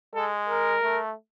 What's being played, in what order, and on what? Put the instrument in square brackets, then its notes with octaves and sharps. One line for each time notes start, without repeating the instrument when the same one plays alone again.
[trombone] G#3 [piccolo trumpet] A4
[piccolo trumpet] A#4
[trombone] A3